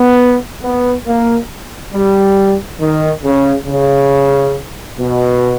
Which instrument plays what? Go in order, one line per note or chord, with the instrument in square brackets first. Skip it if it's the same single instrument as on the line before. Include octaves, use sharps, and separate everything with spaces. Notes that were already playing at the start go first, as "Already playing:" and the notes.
Already playing: [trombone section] B3
B3
A#3
G3
D#3
C#3
C#3
B2